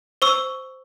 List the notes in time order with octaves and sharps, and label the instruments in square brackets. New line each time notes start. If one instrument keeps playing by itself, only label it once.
[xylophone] C5 C#6 E6